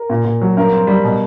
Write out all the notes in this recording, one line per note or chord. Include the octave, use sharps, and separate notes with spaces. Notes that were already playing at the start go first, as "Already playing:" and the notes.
Already playing: A#4
A#2
A#2
F#3
G2 A#4
C4
G3
B2